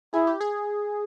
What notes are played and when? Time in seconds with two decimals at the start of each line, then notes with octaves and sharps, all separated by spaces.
0.14 E4 G#4
0.27 G4
0.41 G#4